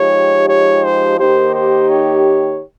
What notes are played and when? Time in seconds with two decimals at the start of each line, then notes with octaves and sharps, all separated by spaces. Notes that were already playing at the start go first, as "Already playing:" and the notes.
Already playing: F3 G#3 D#4 G4 C#5
0.49 C#5
0.84 C5
1.19 D#3 A#3 D#4 G4 C5
1.54 C5
1.89 C#5